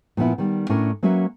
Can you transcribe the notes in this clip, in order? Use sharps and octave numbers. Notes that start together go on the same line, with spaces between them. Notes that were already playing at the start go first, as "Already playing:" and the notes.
A#2 F3 B3 E4
D#3 G3
A2 C#4 D4 E4 A#4
F#3 A#3 C#4 F#4 B4 E5